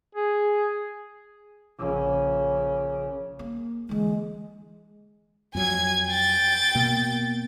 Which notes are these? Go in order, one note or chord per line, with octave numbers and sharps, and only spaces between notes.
G#4
A#1 C#3
A#3
D3 E3 G#3
F2 F#3 G#5 G#6
G5 A6
B2 A#3